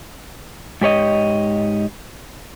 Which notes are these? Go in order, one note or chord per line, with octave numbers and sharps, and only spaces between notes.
G#2 G4 C#5 D#5